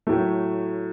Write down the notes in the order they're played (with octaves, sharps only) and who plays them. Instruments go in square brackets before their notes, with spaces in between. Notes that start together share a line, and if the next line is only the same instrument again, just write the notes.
[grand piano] A2 F#3 A3